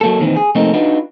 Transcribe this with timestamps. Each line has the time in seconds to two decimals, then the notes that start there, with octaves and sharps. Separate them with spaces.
0.01 F#3 A#3 A4
0.20 E2 A#2 D#3 E3 C4
0.36 G#4
0.55 F2 C3 A3 A#3 C4 D#4
0.73 D4 D#4 F4 F#4 B4